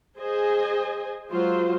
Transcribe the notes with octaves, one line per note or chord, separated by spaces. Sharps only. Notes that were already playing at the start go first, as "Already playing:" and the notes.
G#4 C5 D#5 G#5
F#3 G#3 F4 F#4 C5